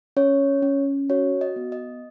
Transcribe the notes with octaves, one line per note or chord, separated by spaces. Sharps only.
C#4 C#5
C#4
F#4 C#5
D#5
B3
D#5